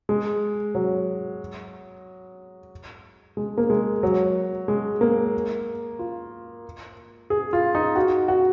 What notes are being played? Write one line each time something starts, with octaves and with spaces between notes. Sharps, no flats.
G#3
F#3
G#3
A#3
G#3
F#3
G#3
A#3
F4
G#4
F4
D#4
F#4
F#4